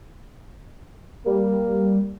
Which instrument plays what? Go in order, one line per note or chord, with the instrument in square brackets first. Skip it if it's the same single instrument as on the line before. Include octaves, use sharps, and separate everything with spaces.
[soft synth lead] G3 [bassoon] A#3